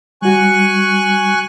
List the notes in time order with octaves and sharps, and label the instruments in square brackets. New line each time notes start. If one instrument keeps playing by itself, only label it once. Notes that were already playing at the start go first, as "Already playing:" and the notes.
[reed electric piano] G3 F#4 [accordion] G#5 C#6 F#6